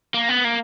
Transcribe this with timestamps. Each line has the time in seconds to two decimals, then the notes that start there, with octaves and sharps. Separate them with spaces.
0.14 A#3
0.29 B3
0.45 A#3